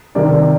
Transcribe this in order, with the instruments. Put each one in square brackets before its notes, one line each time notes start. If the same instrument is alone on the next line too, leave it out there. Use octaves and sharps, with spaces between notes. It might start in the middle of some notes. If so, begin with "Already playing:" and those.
[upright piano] C3 D#3 G3 A#4 D5